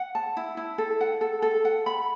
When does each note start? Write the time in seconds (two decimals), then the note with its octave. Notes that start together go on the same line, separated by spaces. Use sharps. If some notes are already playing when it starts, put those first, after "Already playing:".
Already playing: F#5
0.15 A5
0.37 E4
0.57 E4
0.78 A4
1.01 F#5
1.21 A4
1.42 A4
1.65 F#5
1.86 B5